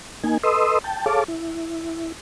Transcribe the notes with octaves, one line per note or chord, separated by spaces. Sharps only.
A#3 D#4 G#5
A4 B4 D#5 C6 D#6 E6
G5 A5
G#4 A4 C#5 F5 A5 D6
E4